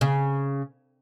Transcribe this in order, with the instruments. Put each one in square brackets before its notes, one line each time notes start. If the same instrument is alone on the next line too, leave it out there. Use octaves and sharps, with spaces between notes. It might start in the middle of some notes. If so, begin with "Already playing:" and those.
[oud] C#3